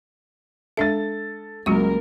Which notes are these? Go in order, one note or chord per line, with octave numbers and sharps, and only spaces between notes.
G#3 D4 A4 E5 A6
C#2 F#3 G#3 A#3 F#4 A#4 C#6